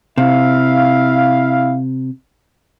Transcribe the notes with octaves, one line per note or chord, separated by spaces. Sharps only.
C3 E4 E5 F5